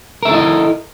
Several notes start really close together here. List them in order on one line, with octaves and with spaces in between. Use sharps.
A#4 E5 A4 E4 D#5